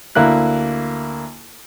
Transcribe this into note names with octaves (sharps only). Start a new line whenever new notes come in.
D2 A#3 E4 F#6